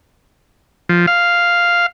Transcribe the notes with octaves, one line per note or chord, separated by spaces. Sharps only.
F3
F5